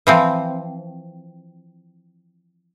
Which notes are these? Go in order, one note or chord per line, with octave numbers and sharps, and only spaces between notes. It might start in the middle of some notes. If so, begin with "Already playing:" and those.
E3 F3 C4